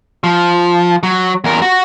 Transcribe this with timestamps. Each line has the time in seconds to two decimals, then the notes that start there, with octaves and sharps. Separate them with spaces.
0.24 F3
1.03 F#3
1.44 E2 A#4
1.62 F#4